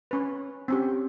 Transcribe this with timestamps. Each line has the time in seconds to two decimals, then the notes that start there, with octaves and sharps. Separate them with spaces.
0.11 C#4 B4
0.68 C4 C#4 G4